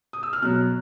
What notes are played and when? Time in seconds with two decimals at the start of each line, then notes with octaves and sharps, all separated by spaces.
0.13 D#6
0.23 E6
0.33 F6
0.42 B2 F#3 F#6